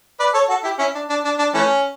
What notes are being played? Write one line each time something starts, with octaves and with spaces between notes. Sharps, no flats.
B4 D5
A4 C#5
F#4 A4
E4 G4
C#4 E4
D4
D4
D4
D4
E3 A3 C#4